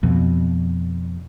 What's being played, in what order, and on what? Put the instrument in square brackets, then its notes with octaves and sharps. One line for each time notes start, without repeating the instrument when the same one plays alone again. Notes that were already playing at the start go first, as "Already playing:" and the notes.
[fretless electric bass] F2 B2